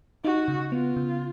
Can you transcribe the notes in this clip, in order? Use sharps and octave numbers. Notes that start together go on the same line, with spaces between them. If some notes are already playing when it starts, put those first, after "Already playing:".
D#4 F#4
C#3
B3 F4
C#3